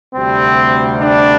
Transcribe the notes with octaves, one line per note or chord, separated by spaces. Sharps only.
D2 C3 G3 C4
D4